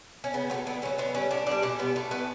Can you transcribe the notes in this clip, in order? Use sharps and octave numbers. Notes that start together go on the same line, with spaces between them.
C#4
C#3 B3
F#3 A3 B3
D3 B3
F#3 A3 C#4
D3 B3
G3 C#4
A2 D4
E3 G3 D4
B2 C#4
G3 B3
A2 A3
E3 A3 B3